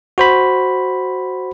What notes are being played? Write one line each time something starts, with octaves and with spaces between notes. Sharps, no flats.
F#4 C5 B5